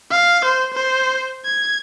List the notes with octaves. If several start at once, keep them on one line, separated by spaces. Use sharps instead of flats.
F5
C5
C5
G#6